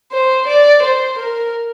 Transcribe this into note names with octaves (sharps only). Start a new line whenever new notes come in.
C5
D5
C5
A#4